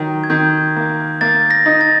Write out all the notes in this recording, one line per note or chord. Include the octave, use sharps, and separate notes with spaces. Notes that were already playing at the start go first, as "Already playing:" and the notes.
Already playing: D#3 F#3
G#6
D#3 G6
A#3
A#3 A6
A#6
D#4
A6